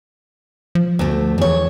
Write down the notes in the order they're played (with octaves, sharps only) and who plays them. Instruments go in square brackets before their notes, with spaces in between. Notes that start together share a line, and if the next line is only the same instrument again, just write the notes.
[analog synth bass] F3
[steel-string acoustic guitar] D2 A3
E2 C#5